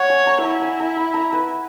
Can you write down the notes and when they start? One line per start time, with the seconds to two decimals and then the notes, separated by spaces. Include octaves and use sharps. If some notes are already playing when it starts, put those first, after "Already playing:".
Already playing: C#5 F#5 A#5
0.10 G#5
0.27 A#5
0.44 E4 A#5
0.62 G#5
0.80 A#5
0.96 B5
1.14 A#5
1.33 B4